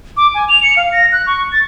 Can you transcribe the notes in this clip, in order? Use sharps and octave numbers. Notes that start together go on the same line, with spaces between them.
D6
G#5
F7
C#7
F5
A#6
F#6
C#6
A6